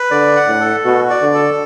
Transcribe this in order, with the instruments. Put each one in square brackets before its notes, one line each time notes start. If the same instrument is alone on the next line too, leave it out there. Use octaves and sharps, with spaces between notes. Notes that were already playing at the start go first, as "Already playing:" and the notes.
Already playing: [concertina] B4
[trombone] D3 [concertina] D5
[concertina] F#5
[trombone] A2
[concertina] A4
[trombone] B2 [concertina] F#4
[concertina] D5
[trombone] D3
[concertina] A4